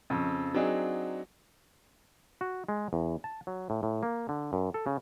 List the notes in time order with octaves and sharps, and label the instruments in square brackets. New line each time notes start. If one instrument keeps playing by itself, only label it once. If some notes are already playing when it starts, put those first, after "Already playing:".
[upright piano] F2 C#3
F#3 C4 D4 D#4 G#4
[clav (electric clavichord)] F#4
G#3
E2
A5
F#3
A2
A2
A#3
D3
F#2
A4
C#3